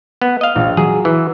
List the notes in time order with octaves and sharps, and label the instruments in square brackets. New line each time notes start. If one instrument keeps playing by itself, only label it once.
[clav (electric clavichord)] B3
D#5 F5
[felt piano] A#1
[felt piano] F#3 [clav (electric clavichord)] G#4
[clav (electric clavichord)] E3